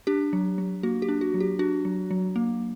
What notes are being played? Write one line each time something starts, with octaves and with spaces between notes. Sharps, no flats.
D4 G4
F#3
F#3
A#3 F#4
G4
D4
F#4
F#3
G4
D4 F#4
F#3
F#3
A#3